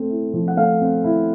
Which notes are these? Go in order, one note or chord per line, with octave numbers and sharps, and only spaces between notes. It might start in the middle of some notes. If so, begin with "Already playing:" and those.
Already playing: A3 C4
E4
F3
F#5
A3 F5
C4
E4